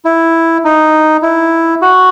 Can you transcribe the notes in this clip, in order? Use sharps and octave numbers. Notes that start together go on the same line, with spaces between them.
E4
D#4
E4
F#4